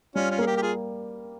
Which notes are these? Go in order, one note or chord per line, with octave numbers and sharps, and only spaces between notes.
G3 C#4 F4
C#4 F4
A#3 G#4
G4 A#4
G4
F4 G#4